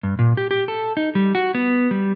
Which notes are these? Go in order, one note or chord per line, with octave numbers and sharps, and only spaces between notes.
G2
A#2
G4
G4
A4
D#4
G3
F#4
B3
G3